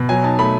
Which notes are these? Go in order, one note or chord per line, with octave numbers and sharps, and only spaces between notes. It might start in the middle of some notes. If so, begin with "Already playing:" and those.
Already playing: B2
F#3 G#5
D#4 A5
A3 B5